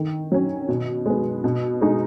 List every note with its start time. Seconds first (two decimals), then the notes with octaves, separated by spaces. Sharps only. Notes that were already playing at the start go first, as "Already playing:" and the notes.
Already playing: D#3
0.32 F#3 C#4
0.69 B2
1.06 G#3 B3
1.44 B2
1.81 G#3 D#4